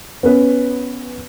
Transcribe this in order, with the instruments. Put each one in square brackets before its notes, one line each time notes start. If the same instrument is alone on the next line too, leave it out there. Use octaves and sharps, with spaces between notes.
[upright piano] B3 C#4 B4